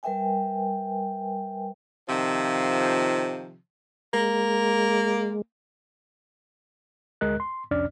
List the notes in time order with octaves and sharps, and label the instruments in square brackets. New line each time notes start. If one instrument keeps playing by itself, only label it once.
[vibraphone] G3 A#4 B4 E5 G5 G#5
[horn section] C3 D#3 F3
[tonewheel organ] G#3 [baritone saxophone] A#3
[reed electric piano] D2 G#3 A#4 D#5 F#6
C6
C2 F2 C#4 D4 D5 F6